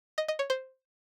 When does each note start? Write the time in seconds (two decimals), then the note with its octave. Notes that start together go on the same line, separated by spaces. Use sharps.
0.18 D#5
0.28 D#5
0.39 C#5
0.50 C5